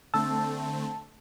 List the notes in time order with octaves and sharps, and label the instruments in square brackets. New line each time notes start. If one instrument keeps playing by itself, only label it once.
[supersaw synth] D3 A3 C4 [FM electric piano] A5 [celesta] E6